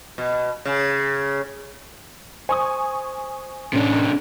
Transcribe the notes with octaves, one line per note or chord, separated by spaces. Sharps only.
B2
C#3
C5 G#5 C#6 D#6
A2 C3 C#4 D4